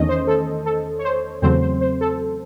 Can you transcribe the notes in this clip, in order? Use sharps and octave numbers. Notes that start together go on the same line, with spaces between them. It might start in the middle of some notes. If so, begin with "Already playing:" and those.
Already playing: E2 D#3 A3 C#4 D#5
C5
A4
A4
C#5
C5
E2 C#3 F#3 A3 C4 C5
C5
C5
A4